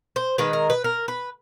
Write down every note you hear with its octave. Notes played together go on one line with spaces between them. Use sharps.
C5
D#3 G#3 B4
A#4
B4
A#4
B4